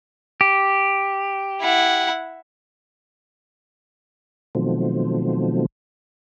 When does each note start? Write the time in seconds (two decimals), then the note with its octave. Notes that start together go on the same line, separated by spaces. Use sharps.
0.41 G4
1.61 E4 F#5
4.55 B2 D#3 F3 F#3 A3 C4